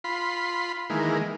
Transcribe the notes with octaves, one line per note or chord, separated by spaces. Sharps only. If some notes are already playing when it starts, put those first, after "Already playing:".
F4 B5 C6
D#3 E3 G#3 A#3